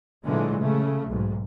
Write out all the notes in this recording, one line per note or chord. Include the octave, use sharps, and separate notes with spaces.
A#2 D3 E3 F#3 G#3 A3
C#3 A3
B1 G#2